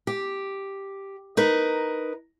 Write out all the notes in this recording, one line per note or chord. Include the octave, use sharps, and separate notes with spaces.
G4
D#4 A#4 B4